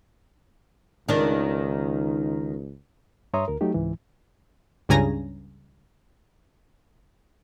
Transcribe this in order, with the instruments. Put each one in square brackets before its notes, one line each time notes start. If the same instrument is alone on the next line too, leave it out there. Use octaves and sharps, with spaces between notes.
[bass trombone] C#2 [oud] D#3 D4
[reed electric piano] G2 C#5 E5 A#5 C6 D#6
D2 A#4
F#3 A3 D#4 G4
C#2 G#2 E3
[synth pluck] C#2 G2 C#3 G#5 A#5 A#6